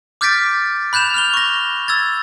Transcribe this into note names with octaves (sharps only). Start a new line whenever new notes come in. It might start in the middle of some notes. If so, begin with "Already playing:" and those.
D6 F6 G6 A6 B6 D7
B5 F#6 G6 E7 F7
F6 F#6 F7 G7
C#6 A#6
E6 G#6 A6